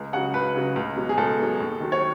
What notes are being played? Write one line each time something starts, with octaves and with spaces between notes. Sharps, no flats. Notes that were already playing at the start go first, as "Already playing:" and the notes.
Already playing: C#2
C#3 F#3 F#5
C#2 B4
C#3 F#3
C#2
B2 F#3
G#4
C#2 A4
B2 F#3
D#2
D#3 F#3
C#5